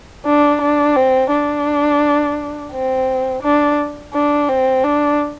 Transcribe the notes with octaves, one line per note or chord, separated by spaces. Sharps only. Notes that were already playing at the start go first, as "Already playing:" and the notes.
D4
D4
C4
D4
C4
D4
D4
C4
D4